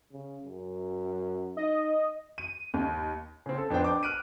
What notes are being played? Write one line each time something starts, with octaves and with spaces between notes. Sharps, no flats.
C#3
F#2
D#4 D#5
D#7
D#2
C#3 C4
A4
F2 D4 B4 C5 G5
G5 D6
F6 F#6 D7 D#7